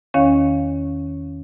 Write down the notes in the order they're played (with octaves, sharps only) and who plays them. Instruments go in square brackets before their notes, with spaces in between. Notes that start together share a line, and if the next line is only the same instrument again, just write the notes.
[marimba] E2 D#3 C#4 C#5 F5